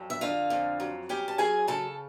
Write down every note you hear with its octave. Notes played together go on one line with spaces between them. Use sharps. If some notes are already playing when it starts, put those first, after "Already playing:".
Already playing: F2 F#3
E5
D3 F4 F5
F2
F#3
C#4 G4 G5
A5
F#3 G#4 G#5
C#3 A4 A5